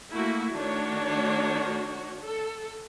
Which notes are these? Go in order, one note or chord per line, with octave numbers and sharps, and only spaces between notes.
A3 A#3 E4 F#4
D#3 A3 D4 F#4 C#5
A4